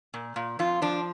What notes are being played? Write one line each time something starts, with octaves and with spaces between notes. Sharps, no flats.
A#2
A#2
F2 F4
F3 D4